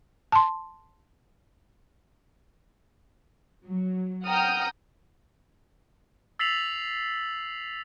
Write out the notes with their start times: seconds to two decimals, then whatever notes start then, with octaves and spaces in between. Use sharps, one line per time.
0.32 A5 C6
3.65 F#3
4.26 F#5 G5 A#5 D#6 F6 G6
6.39 E6 A6 B6 C7 F7 F#7